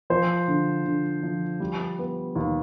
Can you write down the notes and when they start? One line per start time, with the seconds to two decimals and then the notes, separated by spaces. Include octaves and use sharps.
0.10 F3 C5
0.48 D3
0.86 D3
1.23 F3
1.60 G3
1.98 B3
2.36 D#2